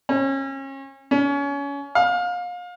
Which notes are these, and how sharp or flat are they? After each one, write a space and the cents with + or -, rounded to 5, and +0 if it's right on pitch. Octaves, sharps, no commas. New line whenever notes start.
C#4 -30
C#4 +30
F5 +30